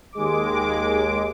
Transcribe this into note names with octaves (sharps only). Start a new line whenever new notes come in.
D#2 G#3 D6